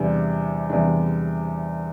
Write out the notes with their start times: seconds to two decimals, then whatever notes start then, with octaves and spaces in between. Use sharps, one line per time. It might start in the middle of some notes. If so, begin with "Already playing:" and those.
Already playing: E2 C3 G3 D4
0.70 E2 C3 G3 D4